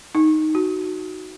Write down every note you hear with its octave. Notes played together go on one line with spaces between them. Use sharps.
D#4
F#4